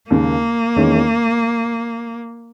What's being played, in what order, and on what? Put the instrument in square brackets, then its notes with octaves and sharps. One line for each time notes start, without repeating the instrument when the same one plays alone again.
[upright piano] D#2 C#3 G#3 [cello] A#3
[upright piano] E2 D#3 G#3 C#4